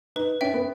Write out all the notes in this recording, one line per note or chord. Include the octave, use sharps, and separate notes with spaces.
D#4 B4
C#4 E5 G5
B3